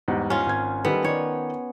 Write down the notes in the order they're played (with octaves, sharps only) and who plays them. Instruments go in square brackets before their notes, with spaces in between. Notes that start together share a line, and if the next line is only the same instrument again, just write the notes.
[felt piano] E2 G#2 G3
[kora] C#4 F4
[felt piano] G#1 G#6
[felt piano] D#3 G3 A4 [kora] B3
[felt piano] D#3 D5 [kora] C#5